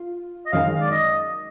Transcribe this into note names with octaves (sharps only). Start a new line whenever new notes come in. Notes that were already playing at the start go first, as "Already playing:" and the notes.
Already playing: F4
D#5
F#2 D#3 G#3 F5
D5
D#5